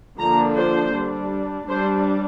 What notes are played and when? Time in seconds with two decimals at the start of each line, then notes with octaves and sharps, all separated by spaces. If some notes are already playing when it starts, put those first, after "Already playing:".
0.18 D3 F3 A#3 D4 A#5
0.56 C5
0.94 G3 D4
1.69 G3 D4 C5